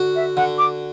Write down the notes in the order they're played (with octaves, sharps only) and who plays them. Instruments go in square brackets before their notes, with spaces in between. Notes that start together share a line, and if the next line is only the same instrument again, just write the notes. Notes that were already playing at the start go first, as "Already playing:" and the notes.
Already playing: [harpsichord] D3 F#4
[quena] E5
[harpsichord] D3 [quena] F#5
[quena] D6